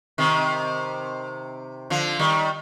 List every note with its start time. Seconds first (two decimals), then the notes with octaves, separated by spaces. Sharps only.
0.18 C3 D#3
1.90 D3 F3
2.19 D#3 G3